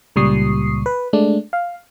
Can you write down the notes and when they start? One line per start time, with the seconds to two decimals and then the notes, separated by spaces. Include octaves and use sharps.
0.16 C#2 A#2 G3 C#6 D#6 C7
0.86 B4
1.13 G#3 A3 D4
1.53 F5